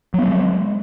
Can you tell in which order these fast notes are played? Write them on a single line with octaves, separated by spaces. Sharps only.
F#3 B3 C4 G#3